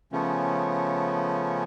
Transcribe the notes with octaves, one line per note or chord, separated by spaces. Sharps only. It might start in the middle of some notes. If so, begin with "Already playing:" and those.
C#3 F3 A3 B3 C#4